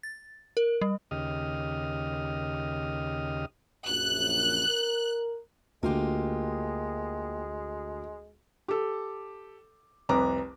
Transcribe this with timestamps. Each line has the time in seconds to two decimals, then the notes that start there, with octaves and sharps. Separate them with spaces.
0.03 A6
0.57 A#4
0.81 G3
1.11 D#2 C#3 G4 D#5 D#6 F6
3.87 A#1 F#2 F#6
4.68 A#4
5.83 D2 G#3 A#3 F4 G4
8.68 G4 A4
10.09 F1 C2 B4 A#5 D6